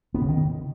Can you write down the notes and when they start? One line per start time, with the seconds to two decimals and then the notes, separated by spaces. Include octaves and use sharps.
0.14 B3
0.22 C#3
0.29 D#3